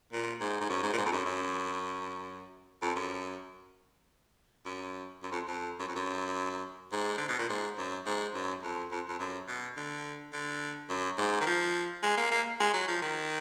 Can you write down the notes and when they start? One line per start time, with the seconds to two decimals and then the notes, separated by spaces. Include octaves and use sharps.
0.13 A#2
0.41 G#2
0.61 G#2
0.69 F#2
0.83 G#2
0.93 A#2
0.98 G#2
1.06 F2
1.12 F#2
1.25 F#2
2.82 F2
2.96 F#2
4.66 F#2
5.23 F#2
5.32 F2
5.48 F2
5.79 F#2
5.88 F2
5.95 F#2
6.92 G#2
7.18 D3
7.28 B2
7.39 A#2
7.50 G#2
7.78 F#2
8.06 G#2
8.34 F#2
8.63 F2
8.91 F2
9.09 F2
9.19 F#2
9.48 B2
9.77 D3
10.33 D3
10.90 F#2
11.18 G#2
11.41 D#3
11.46 F3
12.03 G#3
12.18 A#3
12.32 A#3
12.60 G#3
12.73 F#3
12.88 F3
13.02 D#3